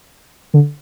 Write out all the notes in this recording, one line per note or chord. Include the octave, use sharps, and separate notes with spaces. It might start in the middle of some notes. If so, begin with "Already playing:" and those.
D3